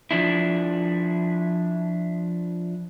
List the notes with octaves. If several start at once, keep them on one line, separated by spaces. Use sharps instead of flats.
F3 D4 E4